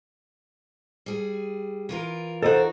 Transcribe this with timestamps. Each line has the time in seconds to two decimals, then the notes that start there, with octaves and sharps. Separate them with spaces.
1.06 G3 G#4
1.89 E3 F4 A#4
2.43 D#4 F#4 A4 B4 C5